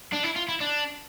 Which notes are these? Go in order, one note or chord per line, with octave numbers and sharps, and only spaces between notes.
D4
E4
F4
E4
D4